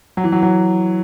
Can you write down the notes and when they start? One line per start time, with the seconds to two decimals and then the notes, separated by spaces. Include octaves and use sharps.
0.17 F#3
0.24 E3
0.32 F#3
0.43 F#3